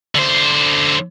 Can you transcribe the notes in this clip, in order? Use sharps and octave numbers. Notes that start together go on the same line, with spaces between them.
D3 C5